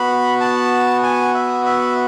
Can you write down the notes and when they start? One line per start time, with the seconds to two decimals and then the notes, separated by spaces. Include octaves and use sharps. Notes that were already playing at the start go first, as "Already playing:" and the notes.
Already playing: B3 F#4 B5
0.41 A5
1.03 G#5
1.35 E5
1.66 E5